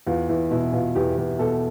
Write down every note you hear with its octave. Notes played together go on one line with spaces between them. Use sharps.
E2 F4
E2 E4
B2 E4
B2 F4
E2 G4
E2
B2 A4